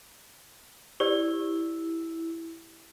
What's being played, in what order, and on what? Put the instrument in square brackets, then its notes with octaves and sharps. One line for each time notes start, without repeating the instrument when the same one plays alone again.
[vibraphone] E4 [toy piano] G4 C5 D5